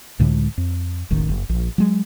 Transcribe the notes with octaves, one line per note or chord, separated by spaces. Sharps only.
C#2 A2 D3 G#3
F2
E1 A1 D#3
F#1
A#1
F#3 G#3